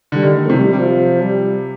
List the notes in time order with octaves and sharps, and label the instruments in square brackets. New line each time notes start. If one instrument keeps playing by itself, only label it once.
[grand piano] D3 [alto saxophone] G3
[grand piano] D#3
[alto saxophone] A3
[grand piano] C3 [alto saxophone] F3
[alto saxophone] G3
G3
F3
G3